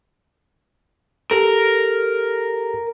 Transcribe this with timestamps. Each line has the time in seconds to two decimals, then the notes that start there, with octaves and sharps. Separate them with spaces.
1.31 G4 A4 A#4